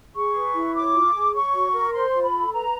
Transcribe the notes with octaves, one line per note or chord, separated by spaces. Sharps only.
G#4 C#6
B4
E4
C#5 D6
F4
G#4
C#5 C#6
F#4
A#4
C5 C6
F4
B5
A4
B4 A#5